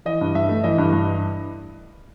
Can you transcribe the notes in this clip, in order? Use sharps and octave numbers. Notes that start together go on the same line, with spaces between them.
E3 D#5
G2
G2 E5
A3
E3 D#5
G2
G2